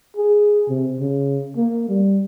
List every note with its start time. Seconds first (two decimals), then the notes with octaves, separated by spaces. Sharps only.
0.17 G#4
0.69 C3
1.00 C#3
1.57 A#3
1.89 G3